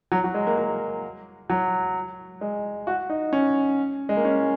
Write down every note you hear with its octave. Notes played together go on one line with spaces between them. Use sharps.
F#3
F#3
G#3
A#3
A#3
F#3
G#3
F#4
D#4
C#4
G#3
A#3
C#4